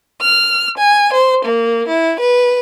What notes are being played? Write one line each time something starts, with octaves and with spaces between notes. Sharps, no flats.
F6
G#5
C5
A#3
E4
B4